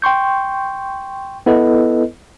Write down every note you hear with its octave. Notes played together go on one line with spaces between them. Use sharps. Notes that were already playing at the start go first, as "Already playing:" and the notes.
G5 C6 C#6 G6
B3 E4 A4 B4 D#5